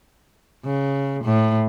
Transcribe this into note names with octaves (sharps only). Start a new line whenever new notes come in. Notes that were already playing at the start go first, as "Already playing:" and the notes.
C#3
A2